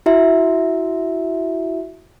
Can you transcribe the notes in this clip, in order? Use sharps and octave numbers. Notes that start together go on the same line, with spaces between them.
E4 F#4 E5